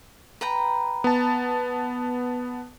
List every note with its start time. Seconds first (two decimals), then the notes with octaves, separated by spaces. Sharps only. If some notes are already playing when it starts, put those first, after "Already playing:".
0.41 B4 G5 A#5
1.04 B3 A5